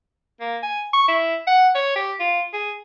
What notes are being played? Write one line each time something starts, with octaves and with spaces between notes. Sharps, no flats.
A#3
G#5
C#6
E4
F#5
C#5
G4
F4
G#4